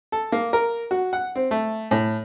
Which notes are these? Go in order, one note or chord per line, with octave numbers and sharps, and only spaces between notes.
A4
A#3
A#4
F#4
F#5
C4
A3
A2